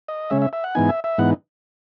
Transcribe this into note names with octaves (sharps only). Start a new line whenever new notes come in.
D#5
C#3 G#3 C#4 E5
E5
E5
F#5
G#2 E3 B3 D#4 G#5
E5
E5
G#2 E3 B3 D#4 F#5